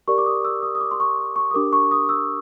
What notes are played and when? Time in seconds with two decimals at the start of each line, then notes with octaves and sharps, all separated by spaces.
0.08 G4 A#4 D5 C#6
0.18 D6
0.26 D#6
0.44 E6
0.63 D#6
0.75 D#6
0.81 D6
0.91 C6
1.00 C#6
1.18 C#6
1.36 C#6
1.51 D#6
1.54 D4 G4 A#4 D6
1.73 C#6
1.91 D#6
2.09 E6